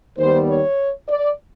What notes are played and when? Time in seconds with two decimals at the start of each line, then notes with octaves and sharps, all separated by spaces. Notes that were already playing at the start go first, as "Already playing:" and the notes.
0.18 D#2 D#3 G3 B3 C5
0.49 C#5
1.08 D5